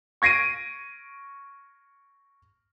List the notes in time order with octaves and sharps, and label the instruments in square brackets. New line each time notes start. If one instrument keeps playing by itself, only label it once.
[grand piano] C#6 G#6 A#6 C7 D7 D#7